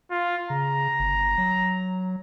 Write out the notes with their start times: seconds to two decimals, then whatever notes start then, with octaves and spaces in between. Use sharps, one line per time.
0.11 F4
0.50 C#3 A#5
0.99 G1
1.38 F#3